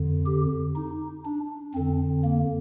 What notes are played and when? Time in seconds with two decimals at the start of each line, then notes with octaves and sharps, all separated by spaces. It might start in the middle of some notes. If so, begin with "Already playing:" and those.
Already playing: F2 D3
0.26 G4
0.76 D#4
1.25 D4
1.75 F2 D3 C4
2.24 A#3